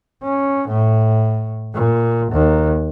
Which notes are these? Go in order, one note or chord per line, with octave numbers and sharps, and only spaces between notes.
C#4
A2
A#2
D#2